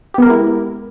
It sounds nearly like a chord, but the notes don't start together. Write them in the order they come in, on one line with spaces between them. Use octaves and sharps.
G4 B3 A#4 G#3 E4